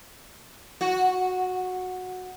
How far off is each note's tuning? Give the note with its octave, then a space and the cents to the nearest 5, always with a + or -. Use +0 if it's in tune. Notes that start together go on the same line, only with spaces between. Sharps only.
F#4 -10